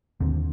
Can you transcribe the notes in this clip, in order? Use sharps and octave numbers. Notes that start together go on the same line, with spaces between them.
D#2 D3 C4